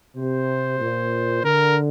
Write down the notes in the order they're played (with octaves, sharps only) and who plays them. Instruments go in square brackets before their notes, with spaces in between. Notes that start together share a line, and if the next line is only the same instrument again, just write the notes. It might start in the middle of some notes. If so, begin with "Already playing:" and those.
[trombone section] C3 [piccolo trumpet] C5
[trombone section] A#2
[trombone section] D3 [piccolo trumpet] A#4